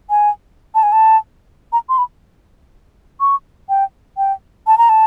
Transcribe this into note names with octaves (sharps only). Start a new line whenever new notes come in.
G#5
A5
G#5
A5
A#5
C6
B5
C#6
G5
G5
A5
A#5
A5